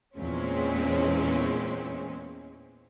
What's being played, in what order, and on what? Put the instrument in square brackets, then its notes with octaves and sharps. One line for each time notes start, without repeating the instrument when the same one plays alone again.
[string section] E2 A#2 G#3 C4 C#4